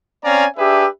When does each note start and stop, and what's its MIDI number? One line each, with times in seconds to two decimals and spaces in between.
0.24 0.46 60
0.24 0.46 61
0.24 0.46 74
0.24 0.46 77
0.24 0.46 80
0.24 0.46 82
0.57 0.86 62
0.57 0.86 67
0.57 0.86 68
0.57 0.86 71
0.57 0.86 76